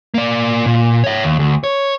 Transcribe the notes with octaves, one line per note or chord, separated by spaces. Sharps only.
A#3 D5
A#2
C#5 E5
D#2
D2
C#5